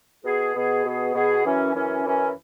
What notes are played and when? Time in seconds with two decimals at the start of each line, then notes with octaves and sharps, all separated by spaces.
0.24 B2 B3 G#4
0.54 B2 B3 G#4
0.84 B2 B3 G#4
1.14 B2 B3 G#4
1.44 F#2 E3 C#4
1.74 F#2 E3 C#4
2.04 F#2 E3 C#4